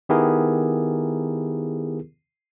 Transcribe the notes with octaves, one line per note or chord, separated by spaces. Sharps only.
D#3 B3 E4 G4 G#4 A#4